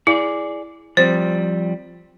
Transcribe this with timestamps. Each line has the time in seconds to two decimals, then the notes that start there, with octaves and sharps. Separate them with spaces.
0.07 E4 G#4 D5
0.97 F3 G3 C4 C5